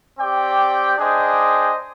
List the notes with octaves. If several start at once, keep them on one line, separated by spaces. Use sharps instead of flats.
C4 G4 D5 G5
D4 G#4 C5 D#5 G5